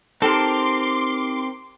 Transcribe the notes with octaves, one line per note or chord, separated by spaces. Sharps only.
C4 D#4 G4 A4 A#4 C6 D6